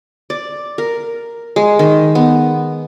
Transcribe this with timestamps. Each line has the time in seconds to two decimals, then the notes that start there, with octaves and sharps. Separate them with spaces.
0.30 D5
0.78 A#4
1.56 G#3
1.79 D#3
2.15 B3